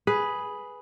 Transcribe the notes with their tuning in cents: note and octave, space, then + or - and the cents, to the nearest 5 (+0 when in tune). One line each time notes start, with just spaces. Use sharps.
G#4 +5 B4 +0